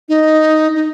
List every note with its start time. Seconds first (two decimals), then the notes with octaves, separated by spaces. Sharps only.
0.09 D#4
0.75 D#4